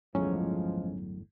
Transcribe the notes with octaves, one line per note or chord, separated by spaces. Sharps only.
G1 E2 A2 F3 F#3 G#3 C#4